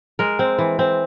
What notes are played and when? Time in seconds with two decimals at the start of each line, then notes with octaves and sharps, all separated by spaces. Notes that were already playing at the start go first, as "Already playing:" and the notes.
0.19 G#3 A#4
0.39 C4
0.58 E3
0.79 C4